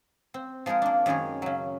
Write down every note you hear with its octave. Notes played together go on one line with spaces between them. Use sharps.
C4
F3 G#3 D#4 G#4 A#4
A#3 D4
F#2 D#3 G#3 G#4 C#5
C#3 F#3